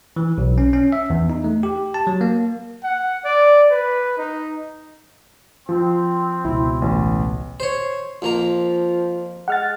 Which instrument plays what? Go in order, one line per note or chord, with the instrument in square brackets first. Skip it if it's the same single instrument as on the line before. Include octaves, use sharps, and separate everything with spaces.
[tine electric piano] E3
B1
C#4
C#4
E5
E2
D#4
A3
G4
A5
F#3
A#3
[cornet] F#5
D5
B4
D#4
[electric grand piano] F3 [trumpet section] C4
[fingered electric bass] C#2 B2 [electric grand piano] E4
[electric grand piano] A1
[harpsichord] C5 C#5
[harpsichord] F2 A#3 A#5 [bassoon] F3
[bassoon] G#3 [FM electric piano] F#5 F6 A6